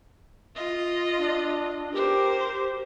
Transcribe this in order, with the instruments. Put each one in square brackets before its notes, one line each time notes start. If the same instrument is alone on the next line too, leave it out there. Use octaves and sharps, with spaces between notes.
[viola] F4 D#5
[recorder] D4
[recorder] G4 [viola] A#4 C5